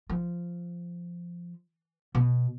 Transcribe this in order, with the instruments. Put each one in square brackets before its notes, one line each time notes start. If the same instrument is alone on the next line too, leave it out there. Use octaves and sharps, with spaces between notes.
[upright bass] F3
B2